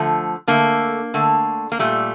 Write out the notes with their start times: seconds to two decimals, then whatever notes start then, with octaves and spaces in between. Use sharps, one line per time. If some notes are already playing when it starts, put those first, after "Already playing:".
Already playing: D3 F3 A3
0.47 D3 A3 A#3
1.14 D3 A3
1.72 A#3
1.79 A#2 G3 A3